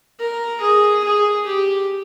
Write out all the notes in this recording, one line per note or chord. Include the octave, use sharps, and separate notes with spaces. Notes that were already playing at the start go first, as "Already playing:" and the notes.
A#4
G#4
G#4
G4